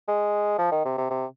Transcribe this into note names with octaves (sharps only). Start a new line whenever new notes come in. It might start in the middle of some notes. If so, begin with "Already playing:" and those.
G#3
F3
D#3
C3
C3
C3